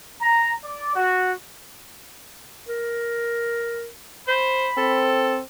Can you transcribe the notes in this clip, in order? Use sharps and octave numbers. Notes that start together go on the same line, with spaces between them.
A#5
D5
F#4
A#4
C5 B5
C4 A4